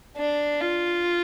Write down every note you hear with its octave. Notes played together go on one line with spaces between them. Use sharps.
D4
F4